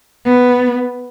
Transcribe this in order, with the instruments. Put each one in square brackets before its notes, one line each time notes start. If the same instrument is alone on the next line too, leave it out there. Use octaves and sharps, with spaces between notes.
[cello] B3